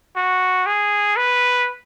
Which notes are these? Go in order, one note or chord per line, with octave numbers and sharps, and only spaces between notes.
F#4
G#4
B4